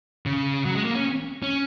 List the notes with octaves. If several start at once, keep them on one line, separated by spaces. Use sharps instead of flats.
C#3
F#3
G#3
A#3
C#4
C#4